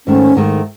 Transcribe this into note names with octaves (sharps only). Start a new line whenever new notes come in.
G#2 D#3 A3 C#4
G#2 D#3 A3